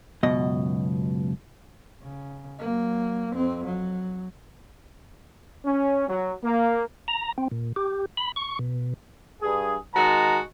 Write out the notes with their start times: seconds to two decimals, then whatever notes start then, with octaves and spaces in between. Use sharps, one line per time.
0.23 C#2 F#2 B2 D#5
2.02 C#3
2.59 F#3 A#3
3.33 F2 C4
3.65 F#3
5.66 C#4
6.09 F#3
6.44 A#3
7.08 A#5
7.38 C4
7.51 A#2
7.76 G4
8.17 B5
8.36 C#6
8.59 B2
9.42 G2 G#4
9.95 D#3 G#3 F#4 A5 A#5